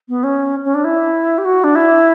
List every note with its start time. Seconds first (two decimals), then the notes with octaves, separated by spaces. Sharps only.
0.09 B3
0.24 C#4
0.64 C#4
0.75 D4
0.85 E4
1.38 G4
1.45 F#4
1.64 D4
1.75 E4